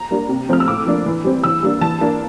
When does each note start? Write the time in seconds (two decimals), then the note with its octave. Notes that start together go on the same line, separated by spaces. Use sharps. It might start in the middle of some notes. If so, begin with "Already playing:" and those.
Already playing: A#5
0.11 G3 A#3 D4
0.29 C3
0.49 F3 A3 C4 F6
0.60 E6
0.68 A2 D6
0.86 F3 A#3 D4
1.06 E3
1.24 G3 C4
1.44 E3 E6
1.63 G3 A#3 D4
1.81 E3 A5
2.01 A#3 D4